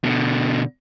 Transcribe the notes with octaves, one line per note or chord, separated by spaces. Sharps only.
B2 D3